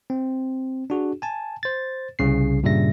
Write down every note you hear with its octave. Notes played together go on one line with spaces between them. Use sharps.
C4
D4 F#4 G#4
G#5 A5
C5 A6
C2 C#3 C7
G2 A#2 C#3 G3 E5 A#6